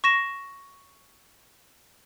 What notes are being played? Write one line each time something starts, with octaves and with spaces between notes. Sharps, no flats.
C#6 A#6 E7